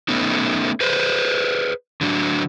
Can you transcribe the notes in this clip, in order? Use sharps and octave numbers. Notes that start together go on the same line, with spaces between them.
A3 B3 C#4 D#4
G#4 B4 C5
D3 F#3 D4